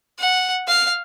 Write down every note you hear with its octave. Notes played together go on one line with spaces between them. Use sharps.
F#5
F5